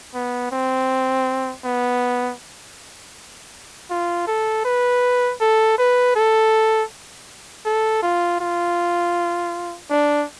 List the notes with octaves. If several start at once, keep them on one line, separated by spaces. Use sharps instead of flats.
B3
C4
B3
F4
A4
B4
A4
B4
A4
A4
F4
F4
D4